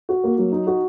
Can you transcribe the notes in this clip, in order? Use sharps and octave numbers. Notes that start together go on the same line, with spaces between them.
F#4
A#3
F#3
D#4
F#4